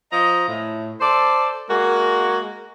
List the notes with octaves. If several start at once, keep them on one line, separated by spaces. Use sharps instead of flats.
F3 D#5 A#5
A2
A4 C5 D5
G#3 A#3 F#4